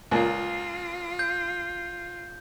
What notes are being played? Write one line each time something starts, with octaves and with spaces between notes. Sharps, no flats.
C#2 A#2 A#3 F4
G6